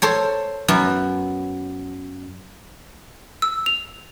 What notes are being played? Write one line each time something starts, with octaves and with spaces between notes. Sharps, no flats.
A4 C5 C#5
F#2 B3 F#4
E6
F7